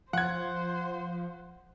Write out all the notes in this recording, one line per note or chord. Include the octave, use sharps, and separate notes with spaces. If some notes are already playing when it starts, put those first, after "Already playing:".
F3 C5 F#5 G#6